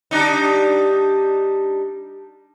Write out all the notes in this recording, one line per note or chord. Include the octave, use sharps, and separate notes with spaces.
G3 D4 D#4